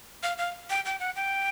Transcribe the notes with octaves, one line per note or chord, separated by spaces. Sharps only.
F5
F5
G5
G5
F#5
G5